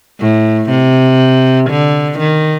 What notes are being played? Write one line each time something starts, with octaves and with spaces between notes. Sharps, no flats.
A2
C3
D3
D#3